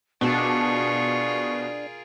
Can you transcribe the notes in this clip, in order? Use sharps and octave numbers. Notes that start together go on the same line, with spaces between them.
B2 D4 F4 G#4 A#4 C#6